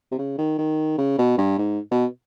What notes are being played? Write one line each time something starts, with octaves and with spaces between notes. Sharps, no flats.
C3
C#3
D#3
D#3
C#3
B2
G2
G#2
B2